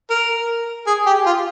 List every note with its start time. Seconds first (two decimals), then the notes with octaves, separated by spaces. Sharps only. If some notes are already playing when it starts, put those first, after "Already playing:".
0.10 A#4
0.87 G#4
1.06 G4
1.26 F4